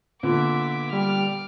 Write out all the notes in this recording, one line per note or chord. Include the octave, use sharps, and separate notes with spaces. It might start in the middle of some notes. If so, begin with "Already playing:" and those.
A#2 D3 B3 E5 D6
G3 D6 F6